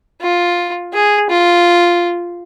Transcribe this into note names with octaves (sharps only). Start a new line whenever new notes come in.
F4
G#4
F4